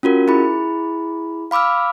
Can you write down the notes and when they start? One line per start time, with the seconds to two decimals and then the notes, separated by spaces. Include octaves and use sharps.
0.03 C#4 F4 F#4 A#4
0.28 E4 G#4 B5
1.51 F5 B5 D6 E6 F6